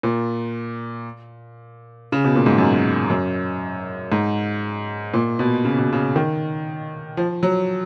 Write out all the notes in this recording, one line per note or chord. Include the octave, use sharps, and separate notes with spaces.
A#2
C#3
B2
A#2
G#2
F#2
F#2
G#2
A#2
B2
C#3
B2
C#3
D#3
F3
F#3